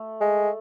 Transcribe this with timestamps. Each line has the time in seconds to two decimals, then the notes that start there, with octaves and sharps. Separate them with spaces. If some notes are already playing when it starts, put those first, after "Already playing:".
Already playing: A3
0.21 G#3